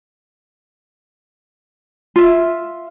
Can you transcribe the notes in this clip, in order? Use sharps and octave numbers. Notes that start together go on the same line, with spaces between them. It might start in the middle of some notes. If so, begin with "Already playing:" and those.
F4 E5